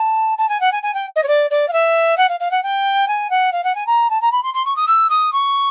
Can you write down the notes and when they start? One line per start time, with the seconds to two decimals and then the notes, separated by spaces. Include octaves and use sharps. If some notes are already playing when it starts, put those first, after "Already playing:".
Already playing: A5
0.38 A5
0.49 G#5
0.60 F#5
0.72 G#5
0.83 G#5
0.94 G5
1.16 D#5
1.23 C#5
1.27 D5
1.50 D5
1.68 F5
1.73 E5
2.17 F#5
2.29 F5
2.40 F5
2.51 F#5
2.63 G5
3.08 G#5
3.30 F#5
3.52 F5
3.64 F#5
3.75 G#5
3.86 A#5
4.10 A5
4.21 A#5
4.32 B5
4.43 C6
4.54 C6
4.65 C#6
4.76 D#6
4.87 E6
5.09 D#6
5.32 C#6